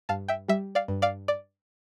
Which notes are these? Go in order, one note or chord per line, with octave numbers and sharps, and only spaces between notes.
G2 F5 A5
E5 G5
G3 E5
D5 F5
G2
D5 F5
D5